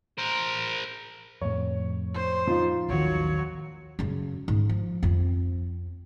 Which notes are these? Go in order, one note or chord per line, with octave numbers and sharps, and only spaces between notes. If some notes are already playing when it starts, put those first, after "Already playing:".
A#4 C5
F2 A2 C#5
C5
F3 D#4 F4
A1 D#2 D#3 F#3 C#5
F#2 C#3
G#2 C#4
F3
F2 C4